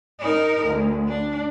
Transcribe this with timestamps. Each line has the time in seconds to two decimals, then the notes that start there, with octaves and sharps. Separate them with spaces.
0.19 D#4 A#4
0.67 D2
1.08 D4